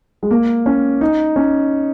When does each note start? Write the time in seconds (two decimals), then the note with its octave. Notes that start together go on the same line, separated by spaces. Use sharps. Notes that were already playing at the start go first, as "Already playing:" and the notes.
0.23 G#3
0.31 A#3
0.66 C#4
1.01 D#4
1.36 C#4